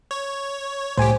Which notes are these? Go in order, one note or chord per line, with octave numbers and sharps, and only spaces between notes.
C#5
C2 A2 G4 C5 G#5